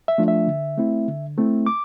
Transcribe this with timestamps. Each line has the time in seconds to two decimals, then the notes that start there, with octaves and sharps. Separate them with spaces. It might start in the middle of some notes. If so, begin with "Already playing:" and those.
0.08 E5
0.18 F3 A3 D4 F4
0.28 E5
0.47 D3
0.78 A3 C4 E4
1.08 D3
1.38 A3 C4 E4
1.67 D6